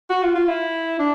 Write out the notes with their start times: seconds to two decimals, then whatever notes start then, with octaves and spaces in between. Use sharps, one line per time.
0.10 F#4
0.23 F4
0.35 F4
0.48 E4
0.99 D4